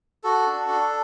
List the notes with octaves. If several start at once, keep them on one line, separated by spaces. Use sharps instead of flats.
F#4 A4
D4
D4